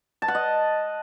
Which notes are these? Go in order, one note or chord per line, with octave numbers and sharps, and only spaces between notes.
A5
F#5
D#5